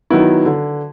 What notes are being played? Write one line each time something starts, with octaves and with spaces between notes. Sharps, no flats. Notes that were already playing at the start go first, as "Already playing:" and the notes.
D#3 F#3 B3 E4
D3